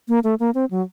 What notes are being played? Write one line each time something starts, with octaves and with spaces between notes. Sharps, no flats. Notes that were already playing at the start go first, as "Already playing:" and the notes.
A#3
A3
A#3
C4
F#3